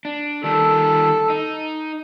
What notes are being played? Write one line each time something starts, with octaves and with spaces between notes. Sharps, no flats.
D4
D#3 G3 A4
D#4